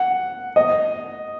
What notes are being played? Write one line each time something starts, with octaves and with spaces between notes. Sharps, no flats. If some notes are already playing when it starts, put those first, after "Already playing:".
Already playing: F#5
D#5